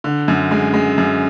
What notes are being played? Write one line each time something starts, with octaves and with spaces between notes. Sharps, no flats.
D3
F#2
G#3
G#3
F#2